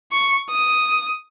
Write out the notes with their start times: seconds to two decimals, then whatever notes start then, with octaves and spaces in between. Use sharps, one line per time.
0.11 C#6
0.50 D#6